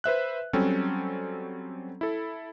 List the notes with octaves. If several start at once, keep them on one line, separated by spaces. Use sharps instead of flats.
B4 C5 E5 F#6
F#3 G3 C4 C#4 A4
E4 A4